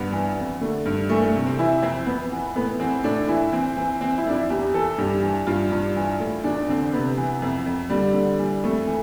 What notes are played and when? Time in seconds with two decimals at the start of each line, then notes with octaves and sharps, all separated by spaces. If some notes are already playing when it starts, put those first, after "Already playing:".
Already playing: G2 B3
0.12 E3
0.37 F2
0.61 D3 A3
0.86 G2
1.10 E3 A3
1.22 A3
1.34 C3
1.46 C4
1.59 E3 E4
1.82 F2 C4
2.07 F2 B3
2.32 E3
2.56 A2 B3
2.80 E3 C4
3.04 A2 D4
3.28 E3 E4
3.52 E3 C4
3.77 E3
4.01 E3 C4
4.18 E4
4.26 F2 D4
4.34 E4
4.50 E2 G4
4.74 E3 A4
4.98 G2 G4
5.22 E3
5.47 G2 F4
5.72 G2
5.96 E3
6.20 A2
6.44 E2 D4
6.69 D3 C4
6.93 C3 B3
7.17 E3
7.42 F2
7.66 F2
7.90 D3 G3
8.14 D3
8.39 E3 G3
8.64 F2 A3
8.87 E3